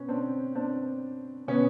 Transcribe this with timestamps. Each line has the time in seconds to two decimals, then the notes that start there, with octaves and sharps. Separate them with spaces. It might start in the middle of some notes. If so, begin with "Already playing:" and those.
Already playing: B2 B3 C#4
0.08 C4 D4
0.55 C4 D4
1.48 B2 B3 C#4